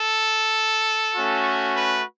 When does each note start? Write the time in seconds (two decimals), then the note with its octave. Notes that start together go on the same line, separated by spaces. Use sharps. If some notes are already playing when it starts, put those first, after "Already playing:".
Already playing: A4
1.13 A3 C#4 F#4
1.76 B4